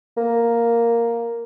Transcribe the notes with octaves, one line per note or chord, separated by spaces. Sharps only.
A#3